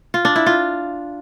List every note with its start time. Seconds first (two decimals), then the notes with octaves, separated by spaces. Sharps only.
0.14 F4
0.25 D4
0.36 E4
0.46 F4